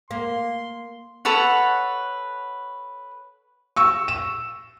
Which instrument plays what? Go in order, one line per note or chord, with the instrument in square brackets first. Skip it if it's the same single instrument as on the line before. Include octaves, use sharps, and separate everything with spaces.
[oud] A#3 [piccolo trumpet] C6
[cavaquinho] A4 B4 C#5 F#5
[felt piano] C#6 E6
E7